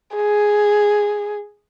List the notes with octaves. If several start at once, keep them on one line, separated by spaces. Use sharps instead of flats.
G#4